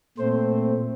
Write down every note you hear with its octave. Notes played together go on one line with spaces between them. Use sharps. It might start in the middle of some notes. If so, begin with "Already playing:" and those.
A#2 A3 C4 C5